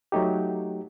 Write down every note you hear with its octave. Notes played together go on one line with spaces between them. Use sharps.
F#3 A3 D#4 G4